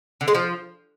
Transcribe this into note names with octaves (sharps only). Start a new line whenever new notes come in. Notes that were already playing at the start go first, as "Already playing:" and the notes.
D3
G#3
F3